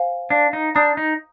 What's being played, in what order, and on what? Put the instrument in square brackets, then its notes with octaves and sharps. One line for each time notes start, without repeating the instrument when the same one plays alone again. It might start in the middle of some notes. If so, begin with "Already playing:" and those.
Already playing: [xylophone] C5 F5 G#5
[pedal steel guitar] D4 [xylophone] F5
[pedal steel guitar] D#4
[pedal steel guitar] D4 [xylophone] A#5 D#6 G6
[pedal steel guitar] D#4